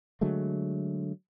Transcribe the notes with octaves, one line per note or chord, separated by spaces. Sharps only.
D3 F#3 G#3 A3